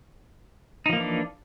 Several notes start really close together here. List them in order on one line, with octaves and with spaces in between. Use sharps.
D#4 F3 A#3 E3 D4